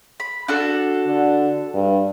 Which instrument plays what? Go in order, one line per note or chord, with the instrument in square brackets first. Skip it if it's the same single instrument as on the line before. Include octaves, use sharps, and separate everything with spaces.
[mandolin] B5
D4 F#4 A4
[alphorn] D3
G2